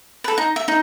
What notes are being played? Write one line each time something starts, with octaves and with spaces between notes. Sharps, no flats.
A4 B4
D#4
E5
D#4